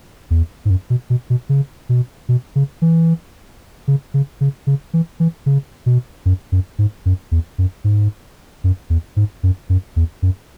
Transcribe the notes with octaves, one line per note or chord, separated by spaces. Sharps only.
E2
G#2
F#2
B2
B2
B2
C#3
B2
B2
C#3
E3
C#3
C#3
C#3
C#3
E3
E3
C#3
B2
F#2
F#2
G#2
F#2
E2
F#2
G#2
F#2
E2
G#2
F#2
F#2
E2
F#2